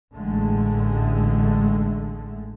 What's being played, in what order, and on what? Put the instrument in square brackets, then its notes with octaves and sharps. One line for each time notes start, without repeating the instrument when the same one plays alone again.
[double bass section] A1 D3 G#3 A3